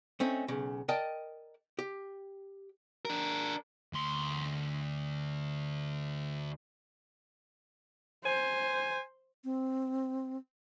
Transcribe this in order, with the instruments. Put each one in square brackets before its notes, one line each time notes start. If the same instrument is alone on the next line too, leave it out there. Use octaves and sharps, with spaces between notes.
[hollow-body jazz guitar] A3 C4 C#4 D#4
B1 C#3
A#4 D5 D#5 G5 A5
G4
[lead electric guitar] D4 A#4
[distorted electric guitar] D2 C6
[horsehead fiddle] C5 [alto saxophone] G#5
[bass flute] C4